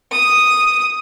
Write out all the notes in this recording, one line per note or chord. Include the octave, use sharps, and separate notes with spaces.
D#6